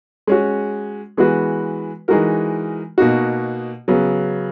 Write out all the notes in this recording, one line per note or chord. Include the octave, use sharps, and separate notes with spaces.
G#3 C#4 F#4
E3 G#3 B3 F#4 B4
E3 G#3 D#4 F#4 A#4
B2 A#3 D#4 F#4
C#3 F#3 B3